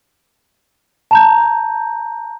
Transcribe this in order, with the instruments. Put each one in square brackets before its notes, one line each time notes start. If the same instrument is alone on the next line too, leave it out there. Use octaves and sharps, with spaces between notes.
[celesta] A5 A#5 G6